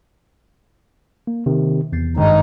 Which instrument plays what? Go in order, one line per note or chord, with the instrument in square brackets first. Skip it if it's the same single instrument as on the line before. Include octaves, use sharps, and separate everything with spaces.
[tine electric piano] A#3
C3 D#3
[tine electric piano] E2 [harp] G6 A6 C7
[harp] G#1 G2 [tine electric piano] G#3 [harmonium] D#4